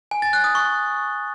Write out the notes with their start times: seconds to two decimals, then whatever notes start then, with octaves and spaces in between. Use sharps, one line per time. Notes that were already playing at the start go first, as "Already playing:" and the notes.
0.11 G#5
0.22 A6
0.33 F#6
0.44 D#6
0.55 C#6